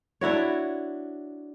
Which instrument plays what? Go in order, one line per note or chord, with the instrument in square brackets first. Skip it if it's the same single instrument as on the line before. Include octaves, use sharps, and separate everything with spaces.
[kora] D4 E4 F#4 C#5